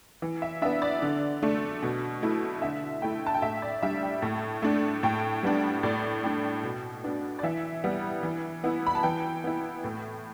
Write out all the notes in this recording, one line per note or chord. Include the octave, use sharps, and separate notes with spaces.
E3
E5
B3 D4 E5
D5
D3
A3 D4
B2
A3 E4
D3 E5
A3 E4 G5
A5
G5
A2 E5
D5
G3 D4 E5
G5
A2
A3 D4
A2 G5
G3 B3 D4
A2 D5
A3 D4 G5
B2
B3 D4
D5
E3 E5
G3 B3
E3
B3 E4
B5
A5
E3 G5
B3 E4
A2